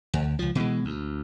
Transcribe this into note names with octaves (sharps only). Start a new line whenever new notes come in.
D2
C#2 F3
B2 E3 G#3
D2